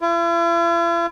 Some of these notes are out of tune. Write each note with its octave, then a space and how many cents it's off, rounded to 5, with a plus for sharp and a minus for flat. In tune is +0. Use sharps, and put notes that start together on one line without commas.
E4 +45